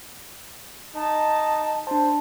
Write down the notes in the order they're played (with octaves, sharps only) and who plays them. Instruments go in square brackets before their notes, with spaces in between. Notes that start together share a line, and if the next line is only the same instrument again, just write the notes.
[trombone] D#4 [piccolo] A5
[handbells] D4 A5 [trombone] C5